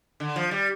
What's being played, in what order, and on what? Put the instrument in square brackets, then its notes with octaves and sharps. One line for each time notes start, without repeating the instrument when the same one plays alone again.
[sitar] D3
F3
G3